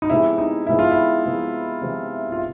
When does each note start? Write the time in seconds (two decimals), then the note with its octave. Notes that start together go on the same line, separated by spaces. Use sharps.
0.02 D#4
0.10 C3 F3 G#3 B3 E4
0.38 D#4
0.67 C3 F3 G#3 B3 E4
0.79 F4
0.91 E4
1.25 C3 F3 G#3 B3
1.82 C3 F3 G#3 B3
2.32 F4